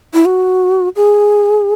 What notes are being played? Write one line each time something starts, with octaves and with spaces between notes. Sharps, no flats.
E4
F#4
G#4